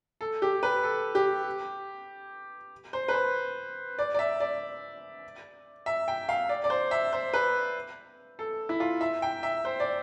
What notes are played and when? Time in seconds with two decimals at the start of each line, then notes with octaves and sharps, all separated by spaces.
0.21 A4
0.42 G4
0.63 B4
0.83 A4
1.15 G4
2.93 C5
3.08 B4
3.14 C5
3.99 D5
4.14 D5
4.19 E5
4.40 D5
5.86 E5
6.08 G5
6.29 F5
6.49 D5
6.64 D5
6.70 C5
6.91 E5
7.12 C5
7.34 B4
8.39 A4
8.69 E4
8.80 F4
9.01 E5
9.22 G5
9.43 E5
9.65 C5
9.80 D5